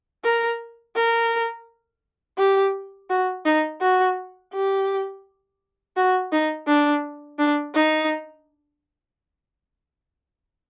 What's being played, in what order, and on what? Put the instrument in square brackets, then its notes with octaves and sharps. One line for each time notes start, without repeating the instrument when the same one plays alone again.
[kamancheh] A#4
A#4
G4
F#4
D#4
F#4
G4
F#4
D#4
D4
D4
D#4